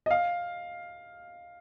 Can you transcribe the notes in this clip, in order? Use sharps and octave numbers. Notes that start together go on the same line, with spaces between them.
D#5
F5